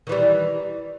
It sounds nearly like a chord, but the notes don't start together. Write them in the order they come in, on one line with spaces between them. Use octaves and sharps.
D#3 E3 G3